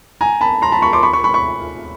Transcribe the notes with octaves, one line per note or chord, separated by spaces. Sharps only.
G#5 A#5
A5 B5
A#5 C6
A5 B5
B5 C#6
C6 D6
B5 C#6
B5 C#6
B5 C#6
B5 C#6